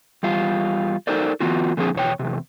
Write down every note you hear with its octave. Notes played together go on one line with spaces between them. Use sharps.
E2 G3 F4
D#4 A4 A#4 C5 D5
E3 B3 F4 F#4
A#2 D3 F3 C4 G#4
E2 B2 C#5 G5
E2 G#2 C3